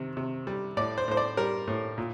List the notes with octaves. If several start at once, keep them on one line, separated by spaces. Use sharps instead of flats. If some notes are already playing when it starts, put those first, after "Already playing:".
Already playing: C3 D#3
C3
G3
A2 D5
C5
A2 C5
D5
G3 A#4
A2
A#2